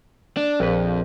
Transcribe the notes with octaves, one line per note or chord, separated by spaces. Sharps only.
D4
A#1 F2 B4